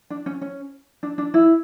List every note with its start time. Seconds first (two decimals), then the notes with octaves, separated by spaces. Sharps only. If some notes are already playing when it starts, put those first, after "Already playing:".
0.10 D4
0.26 C#4
0.41 C#4
1.03 D4
1.18 D4
1.34 E4